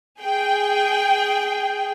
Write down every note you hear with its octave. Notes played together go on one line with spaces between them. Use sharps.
G#4 G5